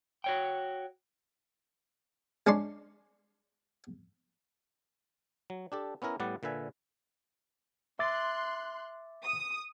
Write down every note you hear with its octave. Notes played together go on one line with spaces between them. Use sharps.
F#4 C#5 G5
G#3 C#4 D4 D5 C6
F#3
D4 G4 A4
B3 C#4 E4 A#4
A2 G3 B3 D5 F#5
A#2 D3 B4 E5 G#5
E5 C6 D6 F#6 A6
D#6